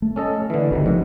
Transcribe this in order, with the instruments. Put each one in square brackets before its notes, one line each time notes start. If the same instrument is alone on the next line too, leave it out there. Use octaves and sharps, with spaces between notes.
[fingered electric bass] A3
[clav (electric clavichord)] C#4 A4 D#5
D3 E3
[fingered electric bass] G1 [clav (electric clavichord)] D2 C3 D#3
[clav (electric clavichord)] G#2 C3 [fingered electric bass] F3